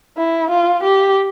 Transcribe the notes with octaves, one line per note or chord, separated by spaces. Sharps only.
E4
F4
G4